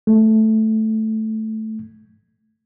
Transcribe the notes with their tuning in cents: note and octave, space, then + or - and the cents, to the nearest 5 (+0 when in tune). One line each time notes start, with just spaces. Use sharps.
A3 -5